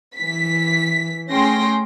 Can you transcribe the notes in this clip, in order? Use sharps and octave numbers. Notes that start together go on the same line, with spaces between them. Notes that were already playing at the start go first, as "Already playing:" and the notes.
E3 B6
A3 C#4 G#4 G5 C6 A#6